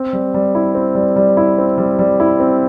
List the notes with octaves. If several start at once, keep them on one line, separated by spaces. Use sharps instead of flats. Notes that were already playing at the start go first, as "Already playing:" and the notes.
Already playing: C4
G3
G3
E4
C4
G3
G3
E4
C4
G3
G3
E4
C4